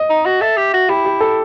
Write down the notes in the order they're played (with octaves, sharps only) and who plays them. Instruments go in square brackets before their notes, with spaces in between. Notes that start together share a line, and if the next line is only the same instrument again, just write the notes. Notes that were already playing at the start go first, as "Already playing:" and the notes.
Already playing: [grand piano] D#5
[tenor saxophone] D#4
F#4
[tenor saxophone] A4 [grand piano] E5
[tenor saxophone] G4
F#4
[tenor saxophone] E4 [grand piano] G4
[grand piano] G4
A4